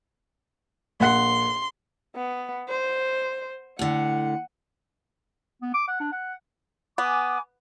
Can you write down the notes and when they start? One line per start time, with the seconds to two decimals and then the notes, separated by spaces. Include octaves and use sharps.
1.00 A#1 F#5 C6
2.16 B3
2.69 C5
3.79 A2 D3 F#5
5.62 B3
5.74 D6
5.88 F#5
6.01 D4
6.12 F#5
6.98 B3 G#5 D6